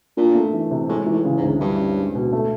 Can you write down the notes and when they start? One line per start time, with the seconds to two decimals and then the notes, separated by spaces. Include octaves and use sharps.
0.17 A#2 D4
0.35 A3
0.53 E3
0.71 C3
0.89 A2 G#3
1.06 E3
1.13 A2
1.25 C#3
1.37 G#2
1.43 D2
1.60 G2 E4
1.79 C#4
1.96 G#3
2.15 B2
2.33 A3